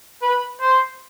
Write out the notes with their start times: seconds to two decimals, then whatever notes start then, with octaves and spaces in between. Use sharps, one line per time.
0.22 B4
0.61 C5